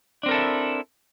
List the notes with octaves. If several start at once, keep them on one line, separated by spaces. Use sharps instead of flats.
C4 D4 E4 A4 A#4